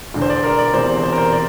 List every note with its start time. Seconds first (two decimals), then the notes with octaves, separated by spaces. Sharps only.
0.14 E1 E2 D3
0.22 C5
0.30 D5
0.44 A#4
0.58 D5
0.74 E1 E2 C3 C5
1.03 C5
1.12 A#4
1.18 C5
1.32 C3 D5